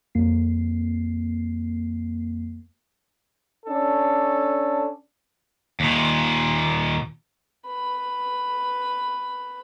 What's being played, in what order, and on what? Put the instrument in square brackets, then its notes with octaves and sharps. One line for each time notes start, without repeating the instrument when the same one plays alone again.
[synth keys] F2 A#3 C7
[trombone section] C#4 D4 A4
[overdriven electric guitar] D#2 A#2
[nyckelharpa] B4 B5